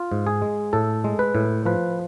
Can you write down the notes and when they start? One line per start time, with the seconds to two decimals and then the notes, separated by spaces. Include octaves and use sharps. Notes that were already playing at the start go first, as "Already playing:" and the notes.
Already playing: F4
0.12 G#2
0.27 G#4
0.42 G#3
0.73 A2 A4
1.04 G#3
1.19 B4
1.35 A2
1.66 F3 B4